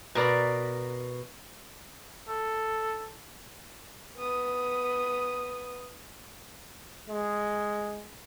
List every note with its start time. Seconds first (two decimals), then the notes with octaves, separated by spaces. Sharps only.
0.15 B2 A#4 D5 A#5 B5
2.29 A4
4.17 B3 D#6
7.09 G#3